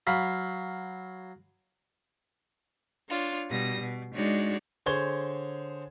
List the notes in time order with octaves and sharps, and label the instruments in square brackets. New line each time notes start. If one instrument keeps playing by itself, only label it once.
[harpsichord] F#3 F5 B5
[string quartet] D4 F4 C#5
B2 G3 D#6 A#6
B2
G#3 D4 D#4 F#4 C#5 D5
[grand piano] D3 G#4 C5 C#5 G#6 G7